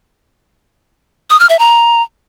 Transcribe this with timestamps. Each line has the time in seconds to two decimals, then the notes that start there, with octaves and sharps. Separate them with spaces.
1.30 D#6
1.40 F6
1.49 E5
1.59 A#5